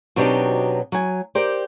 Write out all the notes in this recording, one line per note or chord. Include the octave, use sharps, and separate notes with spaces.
B2 F#3 C4 D4 D#4 G4
F#3 G#5
G4 A#4 C5 D5